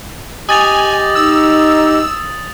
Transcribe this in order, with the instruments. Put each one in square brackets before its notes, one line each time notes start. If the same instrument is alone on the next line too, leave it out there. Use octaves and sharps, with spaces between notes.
[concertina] G4 D#5 [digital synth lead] G#5 [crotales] D#6 A6 F7
[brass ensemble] D#4 [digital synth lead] E6